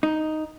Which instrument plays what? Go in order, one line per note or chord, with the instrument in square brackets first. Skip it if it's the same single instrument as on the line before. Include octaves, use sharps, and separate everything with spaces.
[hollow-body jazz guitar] D#4